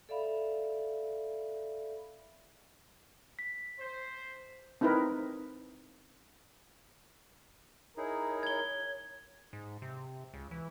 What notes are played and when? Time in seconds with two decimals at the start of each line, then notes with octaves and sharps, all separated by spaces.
0.09 A4 D5 E5 F5 B5
3.39 B6
3.79 C5
4.81 C4 D#4 E4 A#4 B4
7.97 D#4 E4 G#4 A#4 C#5
8.43 G#6 G7
9.53 G#2
9.82 C3
10.34 C#2
10.51 E3